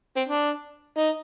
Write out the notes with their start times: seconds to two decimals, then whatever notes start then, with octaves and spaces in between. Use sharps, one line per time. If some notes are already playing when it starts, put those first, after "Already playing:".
0.16 C4
0.28 D4
0.98 D#4